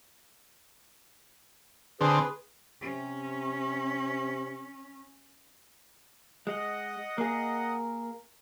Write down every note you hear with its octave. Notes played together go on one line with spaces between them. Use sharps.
D3 C4 G#4 B4
C3 C#4
G#3 D#5 F#5
A#3 G#4 A#4